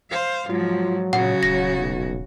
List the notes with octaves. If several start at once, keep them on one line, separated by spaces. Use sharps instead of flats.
C5 F5
G#2 F3 F#3 F4
A#2 C#3 F#4 F#5
D#1 A#6
B1